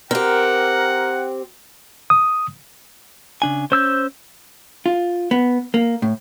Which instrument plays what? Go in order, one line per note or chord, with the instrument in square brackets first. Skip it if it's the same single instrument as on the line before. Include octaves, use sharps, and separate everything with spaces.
[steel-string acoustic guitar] C4 G4 [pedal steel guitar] A#4 [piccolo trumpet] F#5
[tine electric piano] D#6
[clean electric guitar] C#3 D4 G#5
[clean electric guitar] C#4 [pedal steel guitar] C5 E6 G6
[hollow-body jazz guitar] F4
B3
A#3
A2